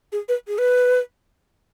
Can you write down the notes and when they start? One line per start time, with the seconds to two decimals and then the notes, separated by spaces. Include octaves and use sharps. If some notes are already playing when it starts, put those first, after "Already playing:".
0.12 G#4
0.29 B4
0.47 G#4
0.58 B4